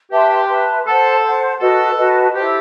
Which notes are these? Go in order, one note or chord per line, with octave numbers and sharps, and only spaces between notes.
G4 B4 E5 A5 C6
B4 E5 A5 C6
A4 C5 F#5 A5
C5 F#5 A5
F#4 A4 B4 D#5 A5
F#4 B4 D#5 A5
E4 G4 A4 C5